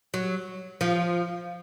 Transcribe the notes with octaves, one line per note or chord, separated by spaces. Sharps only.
F#3
F3